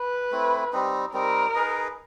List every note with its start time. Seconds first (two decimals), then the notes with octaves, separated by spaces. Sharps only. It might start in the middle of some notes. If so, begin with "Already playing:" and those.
Already playing: B4
0.31 A3 C4 E4
0.73 G3 C4 D#4
1.14 G3 C4 D#4 A#4
1.54 D#4 G#4 B4 D#5